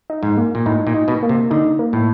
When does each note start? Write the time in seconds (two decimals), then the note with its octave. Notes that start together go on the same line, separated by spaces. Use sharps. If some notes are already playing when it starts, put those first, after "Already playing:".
0.10 D#4
0.23 G#2
0.37 A#3
0.55 A#2
0.66 A2 D#4
0.87 A#2
0.94 D#4
1.08 B2
1.23 A#3
1.29 C3
1.51 D3 D#4
1.79 A#3
1.93 A2